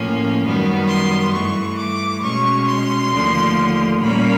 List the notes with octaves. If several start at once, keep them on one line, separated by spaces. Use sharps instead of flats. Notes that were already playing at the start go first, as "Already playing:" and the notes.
Already playing: A2 F3 A#3 C#4
F#2 D#3 G3 B3
C6
G2 E3 A3 C#6
D6
B2 G#3 C#4 C#6
C6
D#2 D3 F3 A3
A#2 G3 A#3 C#4 B5